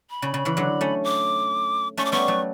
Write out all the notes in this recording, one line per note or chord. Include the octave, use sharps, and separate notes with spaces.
B5
C#3
C#3
C#3 E3
D3 F#3
A3 C#4
D6
A3 C#4 C#6
D6
G3 B3 C#6
F#3 A3